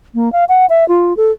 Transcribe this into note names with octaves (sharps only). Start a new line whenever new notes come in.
A#3
F5
F#5
E5
F4
A4